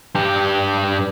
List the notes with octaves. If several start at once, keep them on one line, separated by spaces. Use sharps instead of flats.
G2 G4